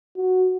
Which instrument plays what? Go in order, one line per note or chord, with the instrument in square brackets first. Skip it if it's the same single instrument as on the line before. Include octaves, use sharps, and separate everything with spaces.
[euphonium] F#4